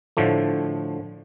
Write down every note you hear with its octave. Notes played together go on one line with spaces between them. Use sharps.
A2 D3 F3 A3